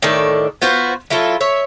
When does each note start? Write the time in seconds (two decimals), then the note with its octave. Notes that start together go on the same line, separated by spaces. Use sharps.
0.02 A2 D#3 D4 A4
0.62 B3 F4 F#4 C5
1.10 F#3 E4 F4 A4
1.41 C#5 E5